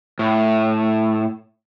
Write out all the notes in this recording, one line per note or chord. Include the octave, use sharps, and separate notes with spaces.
A2